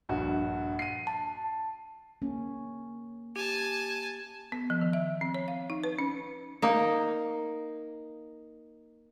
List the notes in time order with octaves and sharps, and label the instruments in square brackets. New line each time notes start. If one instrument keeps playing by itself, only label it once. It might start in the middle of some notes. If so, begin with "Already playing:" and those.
[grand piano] A#1 G2 F#4
C7 D#7
[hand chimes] A5
[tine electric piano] A#3 [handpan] C#4
[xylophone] G4 [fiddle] G#5 A5
[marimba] B3
F3
D#3
E5
C4
C#5
F5
D#4
B4
C#4
[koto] A#3 D#4